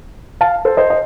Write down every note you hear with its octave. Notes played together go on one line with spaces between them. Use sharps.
F5 A5
A4 C5
C5 D#5
D#5